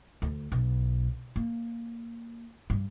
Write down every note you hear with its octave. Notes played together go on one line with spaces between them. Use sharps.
D2
B1
A#3
G2